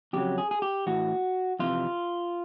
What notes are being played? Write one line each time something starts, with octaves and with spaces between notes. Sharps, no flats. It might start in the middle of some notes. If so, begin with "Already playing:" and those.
F2 C#3 F#3 G4
G#4
G#4
G4
A2 E3 F#4
F2 C3 E3 F4